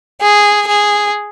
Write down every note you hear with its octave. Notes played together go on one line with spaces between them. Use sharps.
G#4
G#4